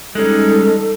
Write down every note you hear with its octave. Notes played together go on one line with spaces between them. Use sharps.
G3 G#3 C#4 D#4 A4